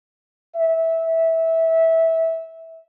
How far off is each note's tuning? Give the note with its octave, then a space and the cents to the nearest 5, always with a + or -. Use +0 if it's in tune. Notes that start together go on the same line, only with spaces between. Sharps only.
E5 -15